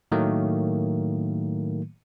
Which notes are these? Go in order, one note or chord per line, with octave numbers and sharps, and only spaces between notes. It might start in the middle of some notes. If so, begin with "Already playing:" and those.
A2 D#3 F#3 A3 A#3